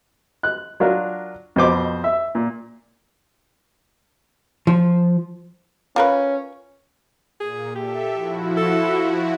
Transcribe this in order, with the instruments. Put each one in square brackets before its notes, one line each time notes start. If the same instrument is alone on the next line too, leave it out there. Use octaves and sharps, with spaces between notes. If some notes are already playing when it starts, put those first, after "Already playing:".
[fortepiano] F#6
F#3 D4 F4 A#4
F2 B2 C5 D6
E5
A#2
[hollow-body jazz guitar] F3
[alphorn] C#4 [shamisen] F4 A#4 B4
[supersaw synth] A#2 [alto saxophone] G#4
[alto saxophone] G4 [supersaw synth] A4 E5
[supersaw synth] F3 E4 F#4
[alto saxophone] A4